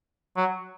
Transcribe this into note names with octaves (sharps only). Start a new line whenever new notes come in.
F#3